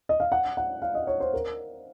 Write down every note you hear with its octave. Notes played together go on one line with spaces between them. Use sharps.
D#5
F5
F#5
F#5
F5
D#5
C#5
C5
A#4